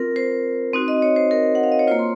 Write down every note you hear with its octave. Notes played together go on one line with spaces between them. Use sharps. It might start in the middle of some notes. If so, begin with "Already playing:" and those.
Already playing: C4 F4 A#4
C5
C4 D#4 F#4
D#5
C#5
C5
A#4
F#5
F5
D#5
C#5
A#3 F4 C5
C6